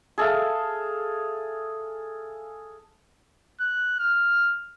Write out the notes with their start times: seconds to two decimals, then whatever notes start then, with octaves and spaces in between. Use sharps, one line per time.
0.18 G#4 A4 E5 F5
3.60 F#6
3.99 F6